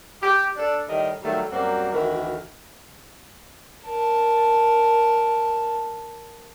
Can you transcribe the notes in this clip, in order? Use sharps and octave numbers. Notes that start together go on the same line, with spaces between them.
G4
D4 A4 D5
A2 D#3 G3 A#4 D#5
D#3 F#3 G3 A3
F#2 G3 A#3 C4 F#4
D2 D#3 E3 F#4 A#4
A#4 A5